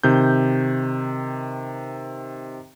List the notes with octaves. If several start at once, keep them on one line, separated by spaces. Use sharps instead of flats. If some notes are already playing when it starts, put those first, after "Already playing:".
C3 D#3 G6